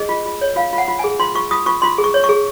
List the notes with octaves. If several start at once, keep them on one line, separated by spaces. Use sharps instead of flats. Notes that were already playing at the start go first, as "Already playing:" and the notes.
Already playing: G#4 D#5
F4
F4
C#5
F4 F5
F4
F#5
F4
G#4 G#5
F4 C6
F4 C#6
F4 D#6
F4 C#6
F4 C6
G#4
C#6
C#5
C#6
G#4